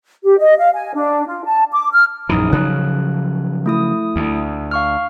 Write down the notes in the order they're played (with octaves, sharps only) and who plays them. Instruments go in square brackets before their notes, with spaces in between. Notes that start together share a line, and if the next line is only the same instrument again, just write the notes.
[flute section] G4
D#5
F5
G#5
D4
F4
A5
D6
F6
[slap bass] A#1 F#2 E3 [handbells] D#4 D#6
[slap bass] C#3 F3 F#3 [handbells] F#6
[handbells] A3 E4 D#6
[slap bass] D2
[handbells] F5 C#6 F6